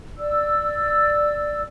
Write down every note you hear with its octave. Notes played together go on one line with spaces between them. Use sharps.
D5 E6